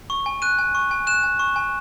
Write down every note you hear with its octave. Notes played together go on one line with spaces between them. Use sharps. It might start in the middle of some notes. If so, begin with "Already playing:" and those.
C#6
G#5
F#6 D#7
G#5
C#6
G#5
F#6 E7
G#5
C#6
G#5